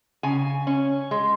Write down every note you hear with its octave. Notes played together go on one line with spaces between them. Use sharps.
C#3 G#5
C#4
G#3